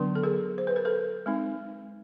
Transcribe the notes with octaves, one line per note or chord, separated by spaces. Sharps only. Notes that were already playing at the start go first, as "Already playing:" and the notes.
Already playing: D3 F#3 B3 D4
A4
G#4 A#4
C5
B4
A#4
A4 B4
G#3 C4 D#4